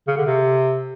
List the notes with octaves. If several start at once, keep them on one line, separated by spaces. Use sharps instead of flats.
C#3
D3
C3